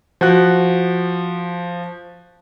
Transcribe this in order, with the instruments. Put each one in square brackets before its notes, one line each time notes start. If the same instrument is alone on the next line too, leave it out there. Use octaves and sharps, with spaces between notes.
[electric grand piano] F3 F#4 F#6